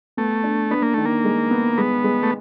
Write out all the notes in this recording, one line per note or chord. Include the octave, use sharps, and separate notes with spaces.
A3 B3
D4
B3 D4
A#3
D#3 A3
A#3
G#3
B3
G#3 B3
G#3
A3